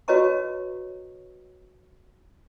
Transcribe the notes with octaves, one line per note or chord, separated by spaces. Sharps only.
F#4 B4 C#5 D#5 A#5 C#6